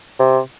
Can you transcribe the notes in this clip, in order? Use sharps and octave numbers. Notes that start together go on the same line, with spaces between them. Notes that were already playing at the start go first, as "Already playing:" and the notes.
C3